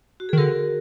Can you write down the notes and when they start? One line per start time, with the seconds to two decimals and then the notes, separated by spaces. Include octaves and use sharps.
0.20 F#4
0.29 D#3 G#4
0.38 D3 F#4 A#4